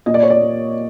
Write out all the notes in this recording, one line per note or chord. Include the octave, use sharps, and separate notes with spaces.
A#2 D#5
D5
C#5
D5
A#3